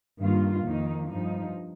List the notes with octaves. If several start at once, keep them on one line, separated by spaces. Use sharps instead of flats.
G2 D#3 A#3 F4
F2 D#3 A#3 D#4
G2 F3 D#4